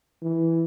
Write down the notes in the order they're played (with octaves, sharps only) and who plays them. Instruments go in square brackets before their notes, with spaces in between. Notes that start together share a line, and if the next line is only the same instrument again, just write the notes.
[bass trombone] E3